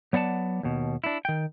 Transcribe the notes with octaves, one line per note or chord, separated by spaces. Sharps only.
F#3 B3 D5 F#5 A5
D#2 B2
D4 E4
D#3 G5